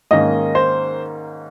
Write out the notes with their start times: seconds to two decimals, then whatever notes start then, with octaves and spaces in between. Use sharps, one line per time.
0.11 G#2 D#3 A#3 C#4 D#5
0.55 C5